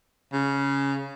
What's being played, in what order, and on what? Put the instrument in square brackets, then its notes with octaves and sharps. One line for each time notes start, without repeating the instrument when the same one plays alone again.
[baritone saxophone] C#3